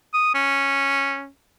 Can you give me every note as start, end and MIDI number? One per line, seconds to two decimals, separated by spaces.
0.14 0.33 87
0.34 1.28 61